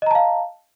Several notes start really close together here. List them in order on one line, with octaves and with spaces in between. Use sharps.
D#5 A#5 A5 F5